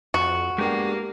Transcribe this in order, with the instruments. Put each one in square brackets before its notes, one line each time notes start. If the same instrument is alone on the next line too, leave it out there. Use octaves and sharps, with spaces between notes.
[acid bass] F2 [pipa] F#4
[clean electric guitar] G#3 B3 D4 [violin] A#3 [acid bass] G4